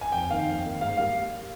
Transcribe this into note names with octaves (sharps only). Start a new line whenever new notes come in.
G#5
F2 G5
D#3 A#3 D#4 F5
F2
D#3 A#3 D#4
G#2 F5
G3 A#3 F5